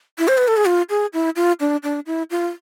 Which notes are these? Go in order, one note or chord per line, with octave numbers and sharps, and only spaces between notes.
E4
C5
B4
A4
G#4
F4
G#4
E4
F4
D4
D4
E4
F4